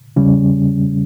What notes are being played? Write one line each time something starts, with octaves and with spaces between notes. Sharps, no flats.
E2 C#3 G3 C#4